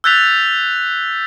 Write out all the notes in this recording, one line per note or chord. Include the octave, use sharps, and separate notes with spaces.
E6 F#6 G6 A6 B6 F7